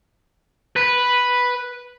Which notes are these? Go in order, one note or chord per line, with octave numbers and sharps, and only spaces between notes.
B4